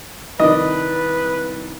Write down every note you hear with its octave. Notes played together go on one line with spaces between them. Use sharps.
C2 D#3 B4 D5 D#5